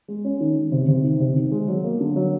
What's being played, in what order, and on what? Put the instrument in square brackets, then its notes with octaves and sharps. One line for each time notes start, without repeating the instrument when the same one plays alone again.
[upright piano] G#3
C#4
D#3
D#3
C3
C3
D#3
C3
D#3
G#3
F#3
A#3
D3
F#3